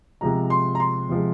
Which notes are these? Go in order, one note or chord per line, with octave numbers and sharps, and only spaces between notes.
C3 F3 G#3 A#5
C6
A#5
C6
C3 F3 G#3